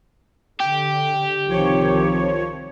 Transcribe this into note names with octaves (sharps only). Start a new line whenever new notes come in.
D3 G4
C2 D#3 F3 C4 C#5